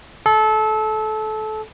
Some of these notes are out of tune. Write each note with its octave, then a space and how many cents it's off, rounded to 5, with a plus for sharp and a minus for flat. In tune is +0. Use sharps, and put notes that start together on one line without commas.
A4 -25